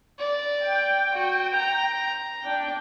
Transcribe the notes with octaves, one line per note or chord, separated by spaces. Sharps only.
D5
G5
F#4
A#5
D4 G5